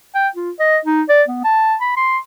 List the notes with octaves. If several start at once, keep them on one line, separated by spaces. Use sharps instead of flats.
G5
F4
D#5
D#4
D5
B3
A5
B5
C6